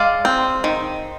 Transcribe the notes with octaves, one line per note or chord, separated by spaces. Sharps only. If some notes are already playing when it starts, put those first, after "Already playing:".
Already playing: G#3 D5 F5
C4
D#3